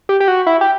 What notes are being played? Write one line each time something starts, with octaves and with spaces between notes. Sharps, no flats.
G4
G4
F#4
E4
G4